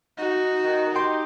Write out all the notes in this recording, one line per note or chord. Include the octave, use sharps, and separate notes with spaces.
D#4 F#4
D#3
G4 G5 C6